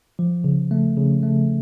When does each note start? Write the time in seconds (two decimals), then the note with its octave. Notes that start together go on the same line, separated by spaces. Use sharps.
0.19 F3
0.44 C#3
0.71 A3
0.97 C#3
1.23 A3